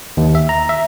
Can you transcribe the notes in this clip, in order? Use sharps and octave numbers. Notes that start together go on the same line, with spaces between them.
D#2
E5
A#5
E5